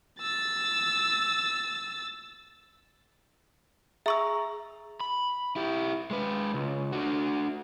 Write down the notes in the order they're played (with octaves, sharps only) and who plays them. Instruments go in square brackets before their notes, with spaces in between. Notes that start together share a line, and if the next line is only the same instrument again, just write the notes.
[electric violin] E6 A6
[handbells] G#4 A#5 [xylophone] E5 C#6 E6
[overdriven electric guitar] B5
E4 G4
G#3 B4
C#2
D4 F#4